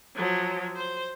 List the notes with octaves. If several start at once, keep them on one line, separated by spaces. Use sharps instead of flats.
F3 F#3
C5